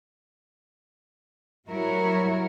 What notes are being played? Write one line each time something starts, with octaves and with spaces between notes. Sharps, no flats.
F#3 G3 E4 F#4 A#4 C#5